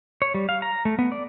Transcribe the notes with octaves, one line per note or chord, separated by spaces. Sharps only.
C#5
G3
F5
A#5
A3
B3
D5